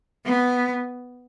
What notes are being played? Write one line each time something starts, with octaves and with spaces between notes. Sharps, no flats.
B3